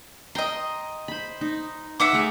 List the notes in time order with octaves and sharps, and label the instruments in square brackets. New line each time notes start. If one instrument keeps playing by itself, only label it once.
[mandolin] D#5 A#5 [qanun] G5 C6
[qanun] C5 B5
D#4
[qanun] D#4 [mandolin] E5 F#5 D6
[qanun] A3 G#4 F5